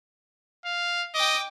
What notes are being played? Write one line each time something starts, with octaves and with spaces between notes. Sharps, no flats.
F5
D#5 G5 D6